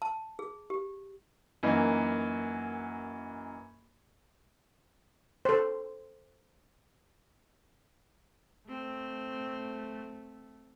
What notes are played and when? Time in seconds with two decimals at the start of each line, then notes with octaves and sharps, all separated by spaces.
0.02 A5
0.39 G#4
0.70 G4
1.63 F#2 E3 A#3 D#4
5.45 A4 C5
8.68 A3 C4